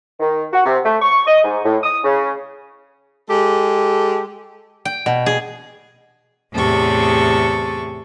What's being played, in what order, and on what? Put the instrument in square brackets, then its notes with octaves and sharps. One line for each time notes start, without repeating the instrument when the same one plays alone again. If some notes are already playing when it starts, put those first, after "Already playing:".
[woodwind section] D#3
F#4
C3
A3
C#6
D#5
G#2
A2
D#6
C#3
[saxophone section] G#3 G4 A4
[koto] G5
B2
G#4
[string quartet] E2 A2 C3 G#4 A4 C#6